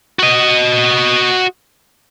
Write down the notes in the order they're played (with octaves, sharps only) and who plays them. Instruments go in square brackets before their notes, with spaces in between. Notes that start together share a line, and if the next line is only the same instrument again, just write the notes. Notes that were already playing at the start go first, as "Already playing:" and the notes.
[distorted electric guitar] F#4 D#5